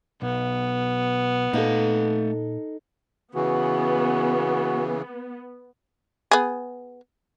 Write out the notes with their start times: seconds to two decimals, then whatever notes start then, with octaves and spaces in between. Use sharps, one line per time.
0.22 B1 B3
1.53 A#2 A3 D#4 A4 F5
3.35 C#3 E3 B3 F#4
6.31 B3 G#4